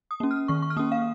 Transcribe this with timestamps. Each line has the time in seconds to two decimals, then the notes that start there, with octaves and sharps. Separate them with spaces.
0.11 D#6
0.20 A#3 C#4
0.31 F6
0.48 D#3 C#6
0.62 C#6
0.70 F6
0.77 A#3 C#4 D#6
0.92 F5